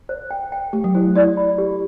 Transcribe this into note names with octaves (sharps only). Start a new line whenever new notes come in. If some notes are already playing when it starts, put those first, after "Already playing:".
C5
G5
G5
A3 G4
F#3
E4 C5
E4 D5
B5
G4